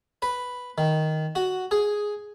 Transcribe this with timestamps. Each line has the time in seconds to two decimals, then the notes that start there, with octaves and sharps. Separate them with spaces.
0.22 B4
0.78 D#3
1.35 F#4
1.71 G#4